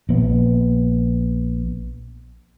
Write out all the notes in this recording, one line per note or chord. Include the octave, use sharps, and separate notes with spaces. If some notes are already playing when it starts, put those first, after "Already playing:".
A#1 B3